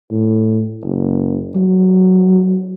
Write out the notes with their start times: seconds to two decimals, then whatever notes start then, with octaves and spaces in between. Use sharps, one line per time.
0.11 A2
0.84 F#1
1.55 F#3